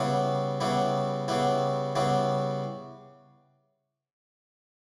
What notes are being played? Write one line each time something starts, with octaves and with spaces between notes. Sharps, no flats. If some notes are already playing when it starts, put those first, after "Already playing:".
Already playing: C#3 G3 B3 E4
C#3 G3 B3 E4
C#3 G3 B3 E4
C#3 G3 B3 E4